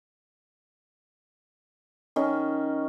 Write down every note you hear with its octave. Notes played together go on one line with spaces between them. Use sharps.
D#3 C#4